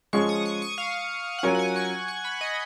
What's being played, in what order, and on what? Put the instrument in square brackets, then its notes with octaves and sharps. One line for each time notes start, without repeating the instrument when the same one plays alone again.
[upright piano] F3 G#3 C#4 G#4 [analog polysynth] C#6
[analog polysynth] D#6
C#6
C#6
F5
F#5
[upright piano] F#3 C#4 F4 A#4 [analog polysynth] G#5
[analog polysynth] F#5
G#5
C#6
C#6
B5
D#5